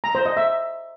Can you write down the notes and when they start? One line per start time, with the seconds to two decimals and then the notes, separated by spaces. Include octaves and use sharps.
0.04 A#5
0.15 C5
0.26 D#5
0.37 E5